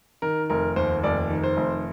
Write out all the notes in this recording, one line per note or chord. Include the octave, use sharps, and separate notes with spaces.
D#3 A#4
F1 A#4
D#2 C5
F1 D5
D#3
C5
F1